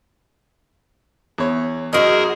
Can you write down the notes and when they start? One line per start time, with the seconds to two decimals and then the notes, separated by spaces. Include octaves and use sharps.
1.38 E2 C#5
1.93 F#2 D#4 F#4 G#4 A#4